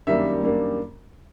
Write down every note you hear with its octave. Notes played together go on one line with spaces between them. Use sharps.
F#2 D#3 G3 A#3 D4 E5
F#2 D#3 G3 A#3 D4